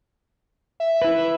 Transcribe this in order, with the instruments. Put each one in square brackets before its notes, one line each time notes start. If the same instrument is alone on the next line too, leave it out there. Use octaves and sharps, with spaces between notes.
[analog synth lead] E5
[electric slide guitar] E4 B4